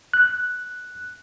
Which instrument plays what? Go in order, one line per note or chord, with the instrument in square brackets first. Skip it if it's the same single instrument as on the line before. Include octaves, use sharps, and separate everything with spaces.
[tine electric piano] F#6